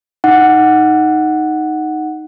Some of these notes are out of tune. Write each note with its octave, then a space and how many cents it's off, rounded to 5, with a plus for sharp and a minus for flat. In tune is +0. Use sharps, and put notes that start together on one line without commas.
D#4 +0 F#5 +0